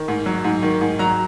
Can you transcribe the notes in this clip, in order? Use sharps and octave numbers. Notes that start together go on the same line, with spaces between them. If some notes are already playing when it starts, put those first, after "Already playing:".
Already playing: D#3
G#2
F#3
G#2
D#3
G#2
F#3 A#5